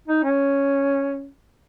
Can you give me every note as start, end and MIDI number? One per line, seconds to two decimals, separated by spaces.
0.08 0.21 63
0.24 1.28 61